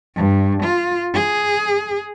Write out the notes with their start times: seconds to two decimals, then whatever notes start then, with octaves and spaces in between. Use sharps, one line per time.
0.16 G2
0.63 F4
1.14 G#4